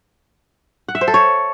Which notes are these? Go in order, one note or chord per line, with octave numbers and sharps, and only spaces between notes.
F#5
E5
C5
A4
C#5